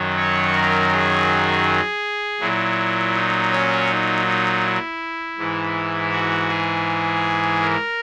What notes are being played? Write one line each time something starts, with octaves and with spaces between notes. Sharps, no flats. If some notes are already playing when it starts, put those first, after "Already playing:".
Already playing: F#2 D#3 F#3
C#5
A#4
G#4
A#2 F#3 E4
D#4
C#4
D#4
D#4
E4
G#2 E3
F#4
G#4
A#4